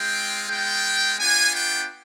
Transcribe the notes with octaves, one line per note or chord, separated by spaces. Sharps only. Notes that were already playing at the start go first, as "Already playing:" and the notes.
Already playing: G#3 C4 F4 G5
G#3 B3 F4 G5
B3 D4 F4 G#5
G5